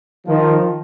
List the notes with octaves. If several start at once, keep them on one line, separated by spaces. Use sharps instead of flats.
D#3 F3